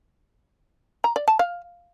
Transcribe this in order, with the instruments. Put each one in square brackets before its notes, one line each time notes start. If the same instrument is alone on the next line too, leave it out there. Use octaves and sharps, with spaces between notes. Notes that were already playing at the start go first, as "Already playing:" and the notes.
[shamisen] A#5
D5
A5
F5